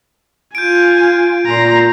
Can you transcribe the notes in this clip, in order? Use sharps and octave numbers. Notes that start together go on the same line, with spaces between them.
F4 G#5 G6 D7
A#2 A#5 C6